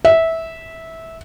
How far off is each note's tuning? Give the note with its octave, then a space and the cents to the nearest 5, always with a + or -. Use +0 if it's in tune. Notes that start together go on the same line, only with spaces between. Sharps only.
E5 -15